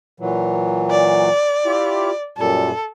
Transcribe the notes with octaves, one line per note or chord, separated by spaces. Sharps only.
A#2 E3 F#3
D5
E4 F4 G4
F#2 A#2 G3 A4